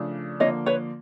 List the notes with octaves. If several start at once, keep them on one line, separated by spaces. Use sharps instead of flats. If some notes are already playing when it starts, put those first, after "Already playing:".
Already playing: C#3 F3 A3 D4
D3 F3 A#3 C#5 D#5
B4 C#5